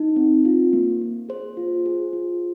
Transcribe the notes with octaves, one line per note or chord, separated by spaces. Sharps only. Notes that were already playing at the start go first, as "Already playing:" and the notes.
Already playing: D#4
C4
F4
A#3
A#3
G#4 C5
F4
G#4
F4